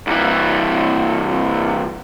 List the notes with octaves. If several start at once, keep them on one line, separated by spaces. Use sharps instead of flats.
C2 E3